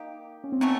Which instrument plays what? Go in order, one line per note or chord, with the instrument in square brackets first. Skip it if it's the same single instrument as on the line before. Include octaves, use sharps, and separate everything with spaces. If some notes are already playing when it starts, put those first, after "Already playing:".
Already playing: [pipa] A#3 D#4 G4
[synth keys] C#4
C4
[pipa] D#3 F#3 A3 C#4 [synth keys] B3